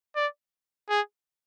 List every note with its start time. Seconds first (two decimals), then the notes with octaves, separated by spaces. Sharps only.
0.16 D5
0.90 G#4